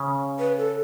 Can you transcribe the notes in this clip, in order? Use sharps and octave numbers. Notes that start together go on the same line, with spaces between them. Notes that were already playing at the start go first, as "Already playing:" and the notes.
Already playing: C#3 C#4
B4
A4